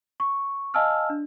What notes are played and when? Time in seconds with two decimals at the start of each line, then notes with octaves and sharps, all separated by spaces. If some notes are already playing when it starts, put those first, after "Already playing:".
0.20 C#6
0.74 D#5 F5 G#5 A5 E6 F6
1.10 D4